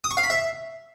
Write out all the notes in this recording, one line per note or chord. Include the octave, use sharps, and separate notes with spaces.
D#6
C#6
F5
B5
E5